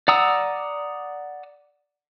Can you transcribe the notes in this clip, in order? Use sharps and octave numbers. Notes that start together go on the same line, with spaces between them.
D5 F#5 A#5 D#6 E6